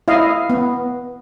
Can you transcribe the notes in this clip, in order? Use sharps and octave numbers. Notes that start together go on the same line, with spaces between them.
E4 D#5 F5
B3